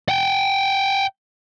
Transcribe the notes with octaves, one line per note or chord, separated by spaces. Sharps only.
F#5 G5